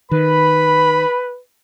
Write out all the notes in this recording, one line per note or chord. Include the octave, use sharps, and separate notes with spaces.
D#3 B4 B5